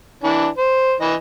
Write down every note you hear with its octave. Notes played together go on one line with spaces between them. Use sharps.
E3 D4
C5
E3 D#5